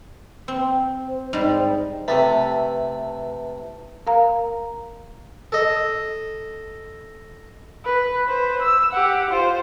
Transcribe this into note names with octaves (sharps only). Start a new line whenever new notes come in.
C4
C5
G#2 G3
C3 A3 B4 A5
A#4 F5 A#5
A4 D#5
B4
B4 C5
E6
G4 F#5
F4 C5